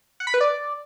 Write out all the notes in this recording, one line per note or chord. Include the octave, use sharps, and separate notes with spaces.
F#5
B5
B4
D5